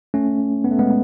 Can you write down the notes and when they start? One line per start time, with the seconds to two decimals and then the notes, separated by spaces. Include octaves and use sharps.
0.14 A3 C#4
0.64 B3
0.71 A3
0.79 G#3 B3